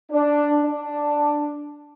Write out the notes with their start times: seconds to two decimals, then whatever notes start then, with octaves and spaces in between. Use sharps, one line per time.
0.11 D4
0.64 D4